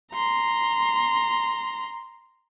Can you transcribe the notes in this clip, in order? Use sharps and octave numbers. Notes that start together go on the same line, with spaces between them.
A#5 C6